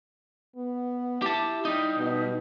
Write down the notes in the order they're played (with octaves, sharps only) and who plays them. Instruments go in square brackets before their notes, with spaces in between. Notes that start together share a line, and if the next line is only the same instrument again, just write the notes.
[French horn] B3
[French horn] E4 [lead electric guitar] G4 A5
[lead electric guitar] G3 D#4
[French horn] B2